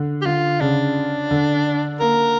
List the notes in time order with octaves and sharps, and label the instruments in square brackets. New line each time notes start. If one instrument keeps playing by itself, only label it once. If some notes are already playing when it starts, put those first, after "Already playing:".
Already playing: [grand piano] D3
[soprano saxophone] G4
[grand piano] D3 [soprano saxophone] F4
[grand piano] C#3 [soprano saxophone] D4
[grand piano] D3
[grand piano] A#3 [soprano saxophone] A#4